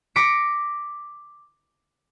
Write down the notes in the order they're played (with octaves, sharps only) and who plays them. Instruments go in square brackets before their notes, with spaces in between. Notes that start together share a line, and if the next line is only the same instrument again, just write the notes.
[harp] D6 A#6 B6 C#7 D7